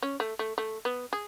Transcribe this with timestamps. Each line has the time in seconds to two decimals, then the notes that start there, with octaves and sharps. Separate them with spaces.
0.02 C#4
0.20 A3
0.39 A3
0.58 A3
0.85 B3
1.13 G#4